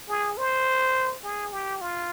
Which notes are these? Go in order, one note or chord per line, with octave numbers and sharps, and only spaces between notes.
G#4
C5
G#4
G4
F4